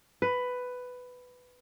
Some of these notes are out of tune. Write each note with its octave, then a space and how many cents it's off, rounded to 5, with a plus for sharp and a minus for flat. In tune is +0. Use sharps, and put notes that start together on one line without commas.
B4 +10